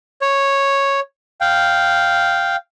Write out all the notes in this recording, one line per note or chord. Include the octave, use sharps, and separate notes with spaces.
C#5
F5 G5